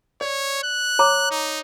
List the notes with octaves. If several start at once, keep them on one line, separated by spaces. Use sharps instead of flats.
C#5 D5
F#6
C#5 A#5 D6
D#4